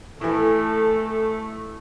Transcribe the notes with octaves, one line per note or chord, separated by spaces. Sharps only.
A2 E3 A3 A4